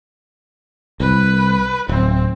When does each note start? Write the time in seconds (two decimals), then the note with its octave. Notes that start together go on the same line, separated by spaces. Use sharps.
1.00 C2 B4
1.89 D1 C4